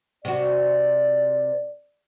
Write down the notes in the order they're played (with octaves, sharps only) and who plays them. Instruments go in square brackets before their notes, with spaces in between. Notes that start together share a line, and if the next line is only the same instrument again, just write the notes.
[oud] C3 F#4 [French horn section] D5